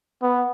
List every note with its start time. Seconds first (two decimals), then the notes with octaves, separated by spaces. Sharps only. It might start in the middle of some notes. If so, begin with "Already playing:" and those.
0.22 B3